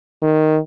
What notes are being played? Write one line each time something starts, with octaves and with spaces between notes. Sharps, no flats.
D#3